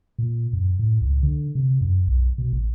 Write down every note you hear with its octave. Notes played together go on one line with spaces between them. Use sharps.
A#2
F#2
A2
C#2
D3
C3
F#2
B1
B2
A1